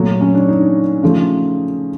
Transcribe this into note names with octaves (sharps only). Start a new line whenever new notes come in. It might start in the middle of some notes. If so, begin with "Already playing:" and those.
Already playing: A#2 F#3 A3
C#4
D4
D#4
C#3 F3 A3